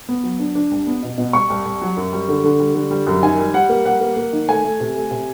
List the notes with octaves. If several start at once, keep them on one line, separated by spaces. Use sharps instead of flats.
B3
F#3
D4
D4
C2
B3
B2
B2
C2 C#6
C2
C2
F#3
F#2
G3
D3
D3
G3
D3
G3
F#2
D#3 G#5
G3
G3 F#5
A#3
G3 F#5
A#3
A#3
D#3
A3 G#5
A3
C3
A3
C3